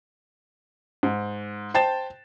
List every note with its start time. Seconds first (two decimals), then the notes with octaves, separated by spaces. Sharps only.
1.03 G#2
1.74 C5 G5 A5 A6 E7